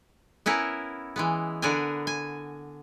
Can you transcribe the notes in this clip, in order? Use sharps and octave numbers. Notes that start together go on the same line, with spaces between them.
B3 C#4 E4 A#4
E3 G#3 B3
D3 B3 D4 A#4 G#5
G#5